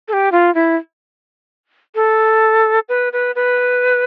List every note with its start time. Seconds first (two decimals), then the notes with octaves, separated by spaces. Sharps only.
0.08 A4
0.13 G4
0.32 F4
0.55 E4
1.95 A4
2.89 B4
3.13 B4
3.35 B4